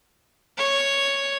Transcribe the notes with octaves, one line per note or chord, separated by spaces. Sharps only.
C#5